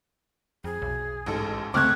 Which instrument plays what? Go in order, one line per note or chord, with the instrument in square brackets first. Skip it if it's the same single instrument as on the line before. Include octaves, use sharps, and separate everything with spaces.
[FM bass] F2 [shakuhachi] G#4
[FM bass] B1
[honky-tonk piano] A1 G#2 A4
[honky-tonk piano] C#2 A3 G#6 [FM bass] C4 [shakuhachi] C#6 [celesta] D6 F6 F#6